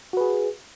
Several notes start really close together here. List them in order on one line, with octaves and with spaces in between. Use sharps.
F#4 B4 G#4